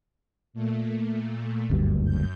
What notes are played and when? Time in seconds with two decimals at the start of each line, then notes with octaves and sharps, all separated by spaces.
0.53 A#2 A3
1.70 F#1 D2 G2
2.04 F#2 G6